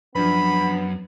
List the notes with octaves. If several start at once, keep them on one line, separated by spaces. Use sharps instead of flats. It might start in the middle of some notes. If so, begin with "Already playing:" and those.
F#2 F3 B3 D4 B4 B5